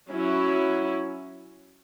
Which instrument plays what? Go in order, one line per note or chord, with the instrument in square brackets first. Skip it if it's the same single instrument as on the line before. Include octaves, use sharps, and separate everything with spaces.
[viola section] F#3 C#4 E4